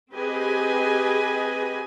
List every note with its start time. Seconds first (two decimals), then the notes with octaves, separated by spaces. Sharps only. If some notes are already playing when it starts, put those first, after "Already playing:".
0.12 C4 G4 G#4 B4 D#5 G#5